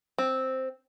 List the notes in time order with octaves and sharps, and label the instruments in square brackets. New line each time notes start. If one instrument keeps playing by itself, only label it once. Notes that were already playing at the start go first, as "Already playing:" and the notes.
[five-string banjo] C4